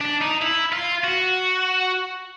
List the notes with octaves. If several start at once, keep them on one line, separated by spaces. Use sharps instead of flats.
D4
D#4
E4
F4
F#4